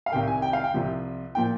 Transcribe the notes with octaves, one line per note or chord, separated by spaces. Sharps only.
F5
C2 C3 D#3 G5
G#5
G5
F5
G5
C2 C3 F3
A#2 F3 G5